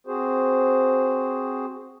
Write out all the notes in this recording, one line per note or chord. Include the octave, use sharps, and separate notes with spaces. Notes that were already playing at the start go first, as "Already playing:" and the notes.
C4 F#4 G#4 C5